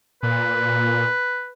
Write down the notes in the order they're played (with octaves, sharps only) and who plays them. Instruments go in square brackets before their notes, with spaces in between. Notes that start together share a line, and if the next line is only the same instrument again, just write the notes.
[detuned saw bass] A#2 [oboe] B4